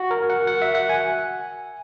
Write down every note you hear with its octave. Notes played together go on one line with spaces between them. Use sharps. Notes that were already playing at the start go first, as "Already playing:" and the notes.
Already playing: F#4
A#4
F#5
F#5
E5
F#5
G#5